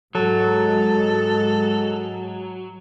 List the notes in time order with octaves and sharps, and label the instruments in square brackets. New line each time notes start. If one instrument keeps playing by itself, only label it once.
[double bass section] G#2 G#3 [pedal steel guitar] F#3 [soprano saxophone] A4